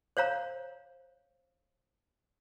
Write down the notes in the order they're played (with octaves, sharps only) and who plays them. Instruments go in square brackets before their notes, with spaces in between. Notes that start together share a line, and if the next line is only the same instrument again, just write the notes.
[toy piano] C5 C#5 F5 A#5